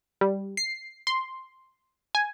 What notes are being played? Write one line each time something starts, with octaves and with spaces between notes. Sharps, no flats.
G3
C7
C6
G#5